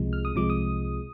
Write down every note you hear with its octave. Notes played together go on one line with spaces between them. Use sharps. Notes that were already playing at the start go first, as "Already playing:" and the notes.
Already playing: C2 C3 F3 G#3
F6
D#6
C2 C3 F3 G#3 D6
D#6